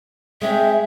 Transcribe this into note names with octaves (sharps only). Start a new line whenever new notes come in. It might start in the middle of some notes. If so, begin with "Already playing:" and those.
G#3 C4 C#5 E5